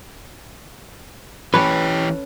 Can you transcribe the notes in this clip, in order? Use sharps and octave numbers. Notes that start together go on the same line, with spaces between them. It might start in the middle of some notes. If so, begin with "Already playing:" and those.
E3 C#4 G4 A4 B4 C#5